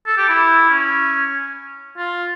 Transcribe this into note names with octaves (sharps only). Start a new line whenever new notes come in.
A4
G4
E4
C#4
F4